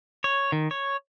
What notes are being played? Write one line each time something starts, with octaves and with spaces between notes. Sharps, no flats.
C#5
D#3
C#5